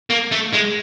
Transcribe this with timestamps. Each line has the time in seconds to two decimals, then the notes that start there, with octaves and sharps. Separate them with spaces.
0.10 A#3
0.32 A3
0.53 G#3